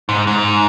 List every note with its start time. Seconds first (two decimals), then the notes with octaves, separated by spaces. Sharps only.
0.09 G#2
0.27 G#2